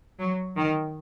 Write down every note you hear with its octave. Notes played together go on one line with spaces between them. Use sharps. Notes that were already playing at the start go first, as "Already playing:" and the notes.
F#3
D#3